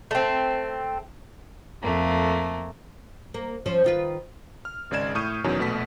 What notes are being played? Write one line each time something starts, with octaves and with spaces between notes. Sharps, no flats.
A3 C4
F2 A3 A#3
A#3
F3 C#4 C5
D#3 F4 B4
F6
G#1 C#3 G#3 D5 G#6 E7
A2 C#6 D#6 F6 G6 D#7
E2 B2 D#3 F#3 C#4
A#1 B2 A3 B6